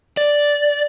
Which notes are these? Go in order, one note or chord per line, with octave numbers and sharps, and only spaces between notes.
D5